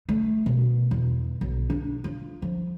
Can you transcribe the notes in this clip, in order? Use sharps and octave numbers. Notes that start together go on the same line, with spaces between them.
A3
B2
E2
B1
D4
F4
F3